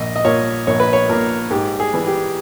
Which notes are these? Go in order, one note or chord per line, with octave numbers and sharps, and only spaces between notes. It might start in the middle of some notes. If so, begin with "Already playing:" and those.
Already playing: A#1 D#5
D#5
A#2 A#3 C#5
A#1 C#5
B4
C#5
A#2 A#3 A#4
G#2 G4
G#4
E3 G3
G4